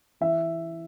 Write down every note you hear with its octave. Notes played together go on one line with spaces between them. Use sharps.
E3 E5